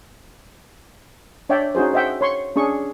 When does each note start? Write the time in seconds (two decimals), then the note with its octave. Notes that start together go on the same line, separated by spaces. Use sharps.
1.49 D4 C#5 D5 E5 G5
1.75 C#4 D#4 F#4 G#4 C5
1.93 C5 D#5 E5 F#5 G5
2.21 C#5 C6 C#6
2.56 C#4 D4 G#4 C#6